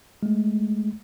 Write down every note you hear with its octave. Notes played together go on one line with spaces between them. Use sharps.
G#3 A3